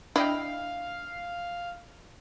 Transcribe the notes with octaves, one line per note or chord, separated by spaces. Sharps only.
D4 E4 D#5 F5 G5